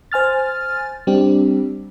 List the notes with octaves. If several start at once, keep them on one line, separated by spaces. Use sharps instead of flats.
C5 G#5 F6 A6
G3 C4 D4 G4